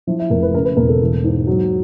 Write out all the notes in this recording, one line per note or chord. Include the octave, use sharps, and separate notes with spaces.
F3 E4
E4
F1 A#4
B4
C#3 A#4
B4
E1 A#4
A4
E3
G#2
F#3